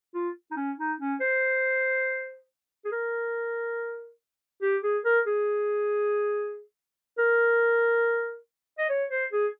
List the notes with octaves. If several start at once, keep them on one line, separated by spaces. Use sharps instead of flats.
F4
D#4
C#4
D#4
C#4
C5
G#4
A#4
G4
G#4
A#4
G#4
A#4
D#5
C#5
C5
G#4